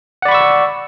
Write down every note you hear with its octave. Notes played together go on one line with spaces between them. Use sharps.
D5 F#5 B5 C#6 E6